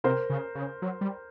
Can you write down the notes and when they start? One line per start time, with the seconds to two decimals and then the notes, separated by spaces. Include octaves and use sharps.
0.04 C3 A#4 C5
0.30 C#3
0.55 C#3
0.82 F#3
1.01 G3